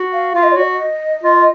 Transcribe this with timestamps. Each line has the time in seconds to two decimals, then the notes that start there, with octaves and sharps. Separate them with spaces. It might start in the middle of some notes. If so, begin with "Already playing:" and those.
Already playing: F#4
0.13 F5
0.34 F4 F5
0.43 D#5
0.52 C#5
0.57 F#4 D#5
1.23 F4